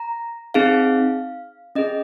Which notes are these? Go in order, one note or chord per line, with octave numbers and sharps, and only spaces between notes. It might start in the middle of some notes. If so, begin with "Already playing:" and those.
Already playing: A#5
C4 D#4 G#4 F5
C#4 G#4 D#5